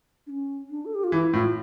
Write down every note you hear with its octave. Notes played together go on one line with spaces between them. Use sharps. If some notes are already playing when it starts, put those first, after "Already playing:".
D4
C#4
D4
A4
G4
F4
E3 E4
A2 F4